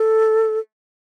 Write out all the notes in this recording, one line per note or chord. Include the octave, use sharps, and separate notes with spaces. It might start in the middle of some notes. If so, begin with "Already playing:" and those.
Already playing: A4